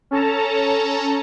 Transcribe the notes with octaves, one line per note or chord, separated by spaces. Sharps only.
C#4 A4 A5 A#5